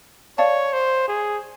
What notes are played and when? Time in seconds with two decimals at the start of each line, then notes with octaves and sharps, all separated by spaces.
0.38 C#5 D5 F5 A5
0.73 C5
1.08 G#4